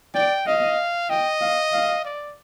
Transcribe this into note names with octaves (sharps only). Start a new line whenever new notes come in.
D5 G5
D#5 F5
D#5 G5
F5
F5
D5